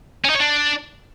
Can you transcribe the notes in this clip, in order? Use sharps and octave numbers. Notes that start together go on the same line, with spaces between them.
C#4
D#4
C#5
D4